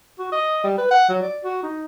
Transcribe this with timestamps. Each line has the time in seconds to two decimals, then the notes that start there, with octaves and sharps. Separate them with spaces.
0.19 F#4
0.32 D#5
0.64 G3
0.78 B4
0.91 F#5
1.09 F#3
1.22 D5
1.44 F#4
1.63 D#4